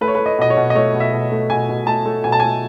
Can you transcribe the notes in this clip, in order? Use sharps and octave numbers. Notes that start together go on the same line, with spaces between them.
A3 B4
C#5
A3 B4
D#5
B2 D#5
C#5
B2
D#5
A3 C#5
B2
E5
B2
A3
B2 G#5
B2
A3 A5
A3
B2 G#5
A5
A3 G#5